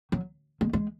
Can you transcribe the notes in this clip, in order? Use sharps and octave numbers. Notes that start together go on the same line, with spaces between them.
F#3
G#3
G#3